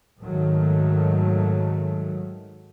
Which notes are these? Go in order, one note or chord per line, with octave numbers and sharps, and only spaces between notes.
G#2 D#3 F#3 A3